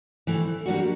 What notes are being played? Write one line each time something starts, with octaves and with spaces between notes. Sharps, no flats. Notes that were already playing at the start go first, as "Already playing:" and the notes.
E3 A3 C4
G3 A#3 D4 F#4